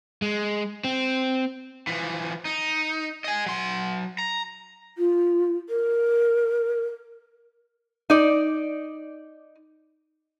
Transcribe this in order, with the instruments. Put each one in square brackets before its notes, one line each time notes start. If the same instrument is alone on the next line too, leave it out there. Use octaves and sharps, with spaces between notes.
[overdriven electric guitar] G#3
C4
E3 F3
D#4
D#5 G#5
F#3 C6
A#5
[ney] F4
A#4
[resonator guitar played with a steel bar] D#4 D5